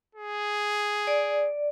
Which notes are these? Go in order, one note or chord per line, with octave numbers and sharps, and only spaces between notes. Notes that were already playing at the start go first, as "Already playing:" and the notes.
G#4
D5